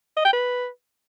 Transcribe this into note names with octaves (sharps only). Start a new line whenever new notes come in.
D#5
G5
B4